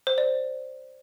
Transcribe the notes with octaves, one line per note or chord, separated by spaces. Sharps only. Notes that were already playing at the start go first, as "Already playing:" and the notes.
C5
D5